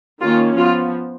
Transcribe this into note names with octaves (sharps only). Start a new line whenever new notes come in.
D#3 A#3 C#4 F4
F3 B3 F4